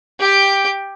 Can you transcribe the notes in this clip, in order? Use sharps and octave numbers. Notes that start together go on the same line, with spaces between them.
G4 G5